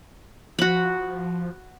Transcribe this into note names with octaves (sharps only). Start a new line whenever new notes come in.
F3 F#4 B5